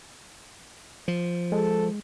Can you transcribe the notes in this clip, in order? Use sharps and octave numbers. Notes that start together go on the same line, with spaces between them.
F3
G#3 A4